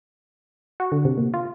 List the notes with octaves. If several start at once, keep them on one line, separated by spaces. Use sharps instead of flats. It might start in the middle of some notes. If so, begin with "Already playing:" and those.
F#4
D3
C3
A#2
F4